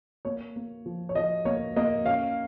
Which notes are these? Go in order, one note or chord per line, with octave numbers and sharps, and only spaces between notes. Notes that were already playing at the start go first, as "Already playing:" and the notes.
A#3 C#5
A#3
F3
C#5
F3 D#5
A#3 C#5
A#3 D#5
C#4 F5